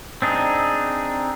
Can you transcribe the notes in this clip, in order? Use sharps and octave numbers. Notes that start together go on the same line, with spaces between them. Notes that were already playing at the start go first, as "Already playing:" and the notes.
C4 D4 D#4 G#4